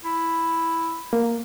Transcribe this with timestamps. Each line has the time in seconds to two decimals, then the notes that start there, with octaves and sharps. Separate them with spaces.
0.05 E4
1.13 A#3